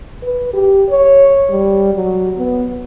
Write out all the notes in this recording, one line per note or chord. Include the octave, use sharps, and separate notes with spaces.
B4
G4
C#5
G3
F#3
B3